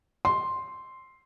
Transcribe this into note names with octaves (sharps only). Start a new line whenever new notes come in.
C6